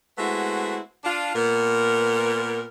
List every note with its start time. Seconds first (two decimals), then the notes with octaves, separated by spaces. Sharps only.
0.18 G#3 A3 B3 C4 E4 F#4
1.05 D4 F4
1.36 A#2 B3 A#4